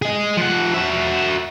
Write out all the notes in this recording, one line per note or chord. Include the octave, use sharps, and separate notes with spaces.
G#4 D#5
F3 F#5
F#4 E5